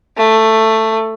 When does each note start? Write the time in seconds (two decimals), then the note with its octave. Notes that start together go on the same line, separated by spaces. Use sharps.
0.17 A3